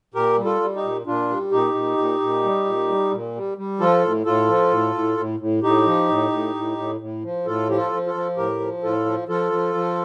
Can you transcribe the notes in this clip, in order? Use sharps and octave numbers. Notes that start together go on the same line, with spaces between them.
A#2 G4 A#4
G3
F4 A4
G3
D#4 G4
A#2
A#2 D4 F4
G3
A#2 D#4 G4
A#2
A#2
A#2
G3
A#2
G3
A#2
G3
G3
F3 F4 A4
A2
A2 F4 A4
F3
A2
A2
A2
A2
A2 D#4 G4
F3
A2
A2
A2
A2
A2
F3
A2 F4 A4
F3 G4
F4 A4
F3
F4 A4
F3
A2 G4 A#4
F3
A2 F4 A4
F3
F3 F4 A4
F3
F3